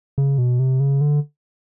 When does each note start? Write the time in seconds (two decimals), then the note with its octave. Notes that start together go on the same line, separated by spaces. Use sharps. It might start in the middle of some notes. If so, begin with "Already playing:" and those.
0.18 C#3
0.38 B2
0.59 C3
0.80 C#3
1.01 D3